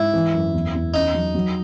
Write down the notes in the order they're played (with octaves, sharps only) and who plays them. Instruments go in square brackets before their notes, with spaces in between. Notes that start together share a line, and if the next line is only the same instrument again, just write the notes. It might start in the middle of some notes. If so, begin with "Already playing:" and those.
Already playing: [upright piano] G#2 [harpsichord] E4
[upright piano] E3
F#2
E2
E2
[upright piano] C#4 [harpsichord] D#4
[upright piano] F#3
F#3